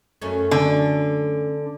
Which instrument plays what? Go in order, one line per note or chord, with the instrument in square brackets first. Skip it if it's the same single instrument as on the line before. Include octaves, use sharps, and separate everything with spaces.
[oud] F#2 A3 C#4
[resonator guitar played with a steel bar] D3